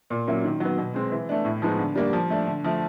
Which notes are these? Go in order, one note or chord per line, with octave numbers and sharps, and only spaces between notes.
A#2
F#3 A#3 C#4 E4
D#3
F#3 B3
B2
G#3 C4
E3
A3 D4
A2
F3 G#3 B3 D#4
D3
G3 A#3 D4
F3
A3 D4
D3
F3 A3